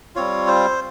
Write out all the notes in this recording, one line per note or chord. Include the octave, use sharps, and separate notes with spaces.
G3 C4 F4 C#5
C5